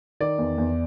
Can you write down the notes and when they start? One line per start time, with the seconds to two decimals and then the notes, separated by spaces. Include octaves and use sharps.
0.20 D#3 D5
0.38 E2
0.58 E2